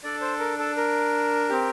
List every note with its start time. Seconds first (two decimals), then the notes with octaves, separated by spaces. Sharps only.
0.03 D4 A4 D5
0.21 C5
0.39 A#4
0.59 A4
0.77 A#4
1.49 C4 G4